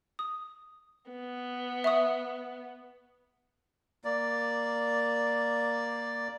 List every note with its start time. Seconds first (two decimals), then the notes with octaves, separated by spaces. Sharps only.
0.19 D#6
1.12 B3
1.84 E5 C#6 D#6
4.04 A#3 D5